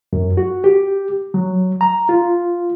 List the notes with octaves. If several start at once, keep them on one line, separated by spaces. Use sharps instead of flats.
F#2
F#4
G4
F#3
A#5
F4